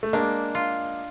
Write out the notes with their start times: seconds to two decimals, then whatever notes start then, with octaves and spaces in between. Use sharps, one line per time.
0.03 A3
0.13 G#3 A#3 D4
0.55 F4